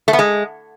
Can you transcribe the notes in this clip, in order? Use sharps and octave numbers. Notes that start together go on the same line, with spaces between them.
A3
B3
G#3